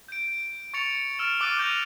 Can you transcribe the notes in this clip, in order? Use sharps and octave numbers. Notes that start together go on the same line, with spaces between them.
G6 D7
C#6 A6 C#7 F7
E6 F6 A6 D7 E7
C#6 D6 E6 F#6 A6 D#7
D6 F6 G6 A#6 D#7 F7